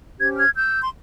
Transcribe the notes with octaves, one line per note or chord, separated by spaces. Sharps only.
C#4 G4 C5 G#6
F6 G#6
E6 G6
C6